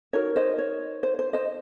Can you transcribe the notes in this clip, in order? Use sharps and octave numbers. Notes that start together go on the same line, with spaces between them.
D#4 F#4 A#4 C#5
C5 D#5
C#5
C5
C5
C5 D#5